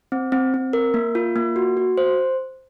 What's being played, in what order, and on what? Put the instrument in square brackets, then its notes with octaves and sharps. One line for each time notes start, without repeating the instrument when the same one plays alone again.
[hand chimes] C4
C4
C4
A#4
A#3
F4
A#3
F#4
F#4
C5